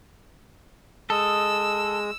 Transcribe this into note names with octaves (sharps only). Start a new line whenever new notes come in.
G#3 A4 D#5 E6